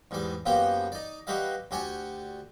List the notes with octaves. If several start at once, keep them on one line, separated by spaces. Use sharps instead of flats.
E2 G#2 G3 D5
F#2 F3 A#3 B3 G4 G5
D#4 D5
G3 F#4 G4 B4 D#5 F5
D2 F#4 G4 D5 G#5 C#6